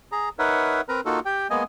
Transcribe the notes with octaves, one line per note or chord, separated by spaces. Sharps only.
G#4 A#5
D#4 A#4 B4 C#5 E5 F#5
C4 A#4 B4 A#5
A#3 D#4 F4 F#4 A4
G4 G5
G#3 A#3 B3 D#5 G#5